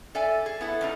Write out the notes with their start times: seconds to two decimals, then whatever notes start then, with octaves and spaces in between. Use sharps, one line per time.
0.15 A4 D5 E5 G#5
0.46 G#4
0.61 B3 E4 A4
0.81 E2 C#3 D#4